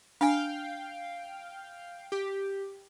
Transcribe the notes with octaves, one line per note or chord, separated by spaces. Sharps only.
D4 F5 G5 G#5
G4